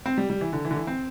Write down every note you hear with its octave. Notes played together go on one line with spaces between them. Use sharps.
C4
G3
G3
E3
D3
E3
D3
E3
C4